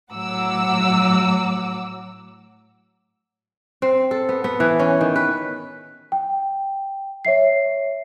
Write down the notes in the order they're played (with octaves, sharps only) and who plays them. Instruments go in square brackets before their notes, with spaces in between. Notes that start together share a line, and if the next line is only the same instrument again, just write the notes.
[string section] A2 F#3 F#5 A#5 D6 E6
[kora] C4
A4
B3
B3
E3
C#4
D#3
B4
[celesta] G5
C#5 E5 C7